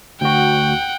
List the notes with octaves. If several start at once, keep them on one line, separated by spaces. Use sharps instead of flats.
D2 F#4 F#5 G5